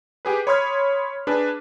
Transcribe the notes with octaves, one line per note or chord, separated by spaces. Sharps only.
G4 G#4 B4
C#5 B5 C6 D#6 F6 G#6
D4 G#4 B4